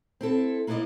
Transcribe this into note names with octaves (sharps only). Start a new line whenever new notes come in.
C4 E4 A4
A#3 B3 E4 C5 D5 D#5